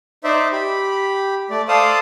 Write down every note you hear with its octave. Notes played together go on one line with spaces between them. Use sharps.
D#4 C5 D5 E5
G4 B5
A3 D5
A4 C5 D5 F5 A5 D#6